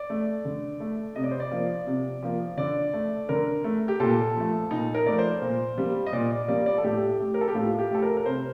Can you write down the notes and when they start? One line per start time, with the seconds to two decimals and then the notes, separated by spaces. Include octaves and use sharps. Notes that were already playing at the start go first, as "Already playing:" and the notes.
Already playing: D5
0.10 A3
0.45 D3
0.80 A3
1.16 C3 D#5
1.24 D5
1.31 C5
1.40 D5
1.51 F3 A#3
1.87 C3
2.23 F3 A#3
2.57 D3 D5
2.93 A3
3.29 D3 A#4
3.64 A3
3.88 G4
4.00 A#2 A4
4.35 F3 A3
4.71 A#2 D#4
4.95 A#4
5.06 F3 A3 D5
5.18 C5
5.41 A#2
5.78 G3 A#3
6.07 D#5
6.13 A#2 D5
6.31 D5
6.48 G3 A#3 D5
6.66 D5
6.78 A4
6.84 A2 G4
7.19 A3
7.34 A#4
7.41 A4
7.48 G4
7.55 A2 F4
7.79 G4
7.91 A3 A4
8.02 A#4
8.17 A#4
8.26 C3 C5